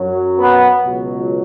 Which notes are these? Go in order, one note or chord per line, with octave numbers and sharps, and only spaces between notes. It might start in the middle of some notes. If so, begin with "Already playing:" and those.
Already playing: F#2 F#3
B3
C#2 B2 F#3